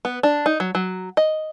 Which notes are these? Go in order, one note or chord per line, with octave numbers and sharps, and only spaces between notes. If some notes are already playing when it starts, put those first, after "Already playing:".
B3
D4
D#4
F#3
F#3
D#5